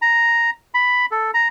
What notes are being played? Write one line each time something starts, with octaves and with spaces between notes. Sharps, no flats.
A#5
B5
A4
A#5